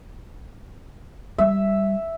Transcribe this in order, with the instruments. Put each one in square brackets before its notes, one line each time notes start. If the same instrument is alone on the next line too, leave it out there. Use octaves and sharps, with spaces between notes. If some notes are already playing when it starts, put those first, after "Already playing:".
[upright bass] G3 [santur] E5